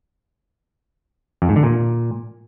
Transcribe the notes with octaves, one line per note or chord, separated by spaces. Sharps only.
F2
G#2
D3
A#2